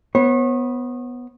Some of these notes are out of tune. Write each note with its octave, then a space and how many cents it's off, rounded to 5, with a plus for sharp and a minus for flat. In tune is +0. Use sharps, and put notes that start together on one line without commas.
B3 +0 C#5 -40